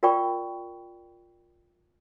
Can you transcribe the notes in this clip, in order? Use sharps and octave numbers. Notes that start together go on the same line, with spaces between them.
F4 A#4 D5 G5 B5 C#6